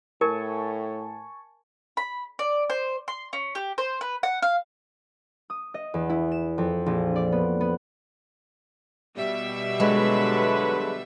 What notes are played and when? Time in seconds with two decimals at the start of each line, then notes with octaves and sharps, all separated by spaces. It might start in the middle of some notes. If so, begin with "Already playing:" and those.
0.21 A2 A#4 G#5 A5 C#6
1.97 B5
2.39 D5
2.70 C5
3.08 C6
3.33 C#4
3.55 G4
3.78 C5
4.01 B4
4.23 F#5
4.43 F5
5.50 D#6
5.74 D#5
5.94 E2
6.10 E4
6.32 E7
6.58 F2
6.86 A#1
7.16 D5
7.32 B3
7.61 B3
9.17 B2 G3 E5
9.80 D3 F#3 G#3 B4